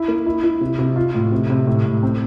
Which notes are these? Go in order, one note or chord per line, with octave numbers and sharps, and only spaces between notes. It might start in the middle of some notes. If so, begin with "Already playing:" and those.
Already playing: E4
A#3
E4
E4
C3
C3
F4
A2
C3
C3
A2
A2
C4